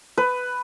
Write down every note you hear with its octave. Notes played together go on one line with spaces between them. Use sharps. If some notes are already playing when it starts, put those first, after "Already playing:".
B4